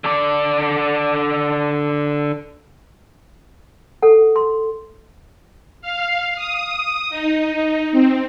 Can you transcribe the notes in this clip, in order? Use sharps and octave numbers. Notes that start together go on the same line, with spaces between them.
D3 D5
A4 F#5
C6
F5
D#6
D#4
C4